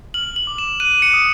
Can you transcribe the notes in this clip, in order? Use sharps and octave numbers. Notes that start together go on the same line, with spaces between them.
F6 F#7
F#7
D6
E7
F#6 D#7
C#7
D#6